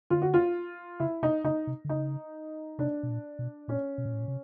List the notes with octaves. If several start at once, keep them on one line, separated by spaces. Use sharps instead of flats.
D3 F4
F#4
F4
C#3 E4
C3 D#4
C#3 D#4
C3
D3
C#3 D#4
C3 D4
B2
A#2
B2
A#2 C#4
B2
A#2
A2
A#2
C3